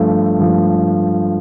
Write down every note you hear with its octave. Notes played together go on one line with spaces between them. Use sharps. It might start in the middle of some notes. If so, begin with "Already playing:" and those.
Already playing: G2 F3 A3
G2 F3 A3